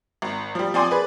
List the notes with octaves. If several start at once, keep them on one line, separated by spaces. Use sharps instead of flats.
G#1
F3 G3
F3 C4 D5 G#5 C6 D6
G#4 B4 D5